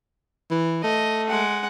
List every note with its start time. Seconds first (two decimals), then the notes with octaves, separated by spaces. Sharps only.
0.50 E3
0.83 A3 D#5
1.28 G#3 F#5